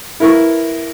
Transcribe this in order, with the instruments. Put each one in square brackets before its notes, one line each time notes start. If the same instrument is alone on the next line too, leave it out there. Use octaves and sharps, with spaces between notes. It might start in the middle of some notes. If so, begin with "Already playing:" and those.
[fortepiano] E4 A#4 B4 C#6